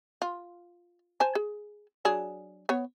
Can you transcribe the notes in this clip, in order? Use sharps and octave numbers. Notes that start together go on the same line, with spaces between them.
F4
C5 G#5 A5
G#4
F#3 D4 G#4
B3 C#5